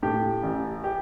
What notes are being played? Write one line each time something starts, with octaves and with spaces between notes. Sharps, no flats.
A2 G4
A1
G4